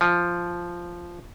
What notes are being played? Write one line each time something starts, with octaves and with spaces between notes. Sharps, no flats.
F3